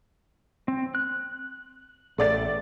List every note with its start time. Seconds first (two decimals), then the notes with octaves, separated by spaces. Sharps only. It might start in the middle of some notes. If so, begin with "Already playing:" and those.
0.68 C4
0.95 F#6
2.18 A1 A3 D5 A6